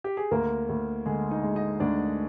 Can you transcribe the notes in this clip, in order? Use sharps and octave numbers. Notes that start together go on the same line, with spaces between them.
G4
G#4
D2 A#3 A#4
D2
D3 G#3 G#4
D#4 D#5
G#3
D#4 D#5
D2 D4 D5